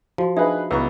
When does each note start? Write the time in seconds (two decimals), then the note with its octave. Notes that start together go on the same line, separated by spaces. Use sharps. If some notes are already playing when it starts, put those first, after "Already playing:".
0.18 F3 F#4
0.37 D4 D#4 G#4 B4 E5
0.71 C#2 B3 E4 B4 C#6